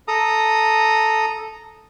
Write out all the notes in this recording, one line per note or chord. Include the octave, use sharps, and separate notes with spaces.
A4 A#5 D#6